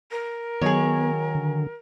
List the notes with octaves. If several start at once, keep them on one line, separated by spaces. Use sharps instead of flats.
A#4
D#3 F#3 B3 G#4 C#5
D3